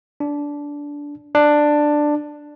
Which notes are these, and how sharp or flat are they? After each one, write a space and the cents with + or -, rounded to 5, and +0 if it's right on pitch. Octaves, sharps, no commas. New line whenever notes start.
D4 -15
D4 +10